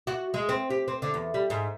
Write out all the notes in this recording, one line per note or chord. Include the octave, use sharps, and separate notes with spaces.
F#4
G#3
C4
G4
C4
D3
E2
G3
G#2